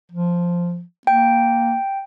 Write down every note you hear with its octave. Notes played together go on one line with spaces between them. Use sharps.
F3
A#3 G5